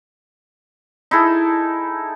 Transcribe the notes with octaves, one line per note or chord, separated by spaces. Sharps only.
D#4 E4 G#4 A4